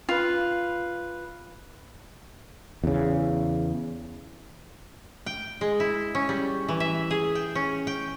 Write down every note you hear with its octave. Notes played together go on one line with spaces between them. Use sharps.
F4 B4
E2 C#3
G5
G#3
E4
C#4
G3
E3
E5
G#4
G5
C#4
G5